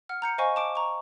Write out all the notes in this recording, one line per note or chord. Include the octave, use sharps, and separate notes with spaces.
F#5 F6
A#5 G6 C#7
C5 D#5 F5 G#5 C#6
A5 D6 D7
A#5 C#6